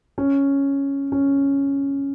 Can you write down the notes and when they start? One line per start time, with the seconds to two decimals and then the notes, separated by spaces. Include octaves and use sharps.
0.18 C#4
1.12 C#4